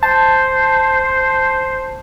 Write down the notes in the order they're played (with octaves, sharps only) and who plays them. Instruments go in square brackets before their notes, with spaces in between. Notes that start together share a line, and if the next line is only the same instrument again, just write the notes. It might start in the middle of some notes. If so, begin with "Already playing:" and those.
[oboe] C5 [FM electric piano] A5